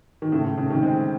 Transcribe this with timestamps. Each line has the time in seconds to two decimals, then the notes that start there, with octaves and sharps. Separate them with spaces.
0.22 D#3
0.32 A2 C#3
0.44 A2
0.57 A2 C#3
0.70 C3 D#3
0.83 G#3 C4